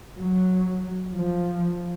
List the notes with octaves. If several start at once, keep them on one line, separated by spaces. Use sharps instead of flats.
F#3
F3